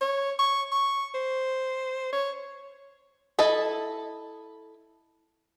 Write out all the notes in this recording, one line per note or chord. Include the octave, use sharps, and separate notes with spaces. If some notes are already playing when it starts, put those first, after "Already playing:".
C#5
C#6
C#6
C5
C#5
E4 A4 D#5